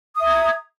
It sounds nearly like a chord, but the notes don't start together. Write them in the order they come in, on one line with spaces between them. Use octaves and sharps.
D#6 E5 A#5 G#6